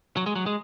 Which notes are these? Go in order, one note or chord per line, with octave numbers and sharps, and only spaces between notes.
F#3
G#3
F#3
G#3